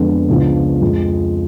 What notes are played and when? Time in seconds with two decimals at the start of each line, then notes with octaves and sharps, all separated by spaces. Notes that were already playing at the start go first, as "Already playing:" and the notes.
Already playing: F2 D3 G#3 B3
0.29 C#2 C#3 F3 B3 D4
0.81 F2 F3 G#3